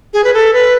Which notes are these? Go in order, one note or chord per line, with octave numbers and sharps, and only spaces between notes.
G#4
B4
A4
B4